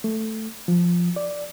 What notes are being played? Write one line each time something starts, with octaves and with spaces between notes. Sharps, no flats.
A3
F3
D5